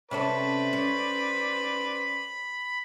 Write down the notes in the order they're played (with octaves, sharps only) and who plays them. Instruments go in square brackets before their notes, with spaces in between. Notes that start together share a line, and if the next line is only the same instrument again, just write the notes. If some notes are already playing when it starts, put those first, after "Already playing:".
[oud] C3 C#4 A4 [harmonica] B4 C5 D5 [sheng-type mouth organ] B5
[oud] C#4